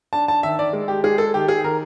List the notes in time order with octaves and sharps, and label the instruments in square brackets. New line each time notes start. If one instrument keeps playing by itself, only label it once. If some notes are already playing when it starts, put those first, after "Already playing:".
[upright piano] D4 A5
A5
D#3 E5
D5
G#3
G4
G#3 G#4
A4
D#3 G4
G#4
D#3 A#4